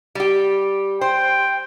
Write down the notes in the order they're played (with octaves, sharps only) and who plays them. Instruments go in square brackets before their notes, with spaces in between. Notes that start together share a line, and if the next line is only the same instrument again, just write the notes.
[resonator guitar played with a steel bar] G3 G4
[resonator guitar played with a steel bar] C5 [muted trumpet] G5